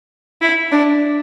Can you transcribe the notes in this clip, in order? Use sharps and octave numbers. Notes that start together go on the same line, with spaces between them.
E4
D4